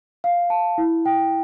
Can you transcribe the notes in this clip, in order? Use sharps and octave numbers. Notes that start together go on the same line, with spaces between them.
F5
A5
E4
G5